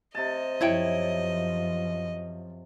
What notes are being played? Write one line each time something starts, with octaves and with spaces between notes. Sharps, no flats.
C3 D#5 A5
F#2 F3 E4 C#5 G5